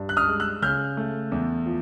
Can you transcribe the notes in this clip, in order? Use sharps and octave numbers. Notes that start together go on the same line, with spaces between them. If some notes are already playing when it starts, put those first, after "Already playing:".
Already playing: G2
F#6
D#6 F6
G#3
E6 F#6
C#3 F6 G6
A3
E2
F3